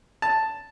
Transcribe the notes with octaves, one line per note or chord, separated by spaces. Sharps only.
A5